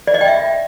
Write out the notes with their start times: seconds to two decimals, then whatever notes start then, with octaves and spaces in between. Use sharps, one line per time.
0.07 D5
0.14 D#5
0.21 G5
0.28 E5